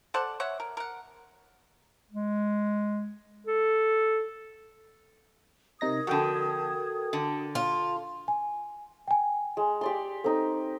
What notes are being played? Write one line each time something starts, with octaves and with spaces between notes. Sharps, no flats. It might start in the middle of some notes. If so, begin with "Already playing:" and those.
A4 C5 D5 F#5
C#5 E5 F#5
A#4
A#4 F#5
G#3
A4
C3 D#4 A#4 D#6 G#6 A#6
F2 D3 F#4 A4 G5
D3
F4
G#5
G5 G#5
G#3
G4 D5 C6
C4 D#4 A4